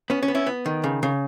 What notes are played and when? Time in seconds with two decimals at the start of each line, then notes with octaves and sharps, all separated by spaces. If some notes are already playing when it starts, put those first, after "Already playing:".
0.10 B3 C#4
0.23 C#4
0.28 B3
0.35 C#4 E4
0.47 B3
0.66 D#3
0.84 C#3
1.03 C#3